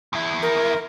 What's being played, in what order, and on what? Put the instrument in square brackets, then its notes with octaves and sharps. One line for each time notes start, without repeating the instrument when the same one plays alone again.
[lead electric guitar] E2 E4
[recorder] A#4